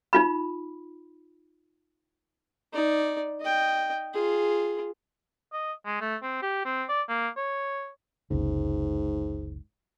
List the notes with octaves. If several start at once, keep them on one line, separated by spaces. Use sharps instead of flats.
D#4 F4 B5
D#4 D5
D#5 G5
F4 G#4
D#5
G#3
A3
C4
G4
C4
D5
A#3
C#5
F#1 C#2 G#2 C3